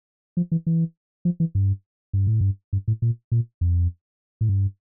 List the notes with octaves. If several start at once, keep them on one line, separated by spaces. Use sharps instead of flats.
F3
E3
E3
F3
E3
G2
G2
A2
G2
G2
A2
A#2
A#2
F2
A2
G2